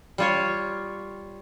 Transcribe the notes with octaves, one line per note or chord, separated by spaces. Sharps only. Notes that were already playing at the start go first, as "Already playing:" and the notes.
G3 F4 C#5